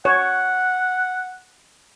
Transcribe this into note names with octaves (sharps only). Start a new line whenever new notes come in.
C#5 F#5